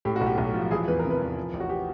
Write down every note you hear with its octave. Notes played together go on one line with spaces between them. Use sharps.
A2 G4
F#4
B1
G4
B1 F#4
F3
E3 G#4
E2 B4
A#4
C3
B4
E2
F3
A1
F#4
G4